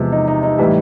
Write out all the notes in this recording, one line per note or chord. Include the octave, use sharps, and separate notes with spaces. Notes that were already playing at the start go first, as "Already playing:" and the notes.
Already playing: E2 C3 F3 G#3
D#4
D#4
D#4
A2 E3 G3